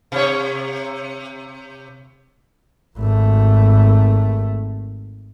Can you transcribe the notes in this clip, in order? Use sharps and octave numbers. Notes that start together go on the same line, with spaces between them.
C3 C#5
G#1 A3